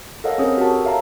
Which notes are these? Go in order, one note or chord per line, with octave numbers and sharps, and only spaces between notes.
A4 A#4 C#5 D#5 F5 F#5
C4 C#4 G#4 A#4 C#5
F#4 G4 A#4 F#5 A5
A4
C#5 E5 F5 A5 A#5